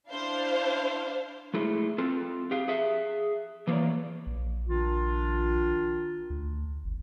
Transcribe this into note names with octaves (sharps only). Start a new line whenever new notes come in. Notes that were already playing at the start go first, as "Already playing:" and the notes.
D4 E4 C5 F5
G#3 A3 E4 G#4
C4 F4 A4
G4 G#4 F5
G#4 E5
E3 A#3 G#4 A4 C#5 D5
A#1
D#3 D4 F4
D2
G1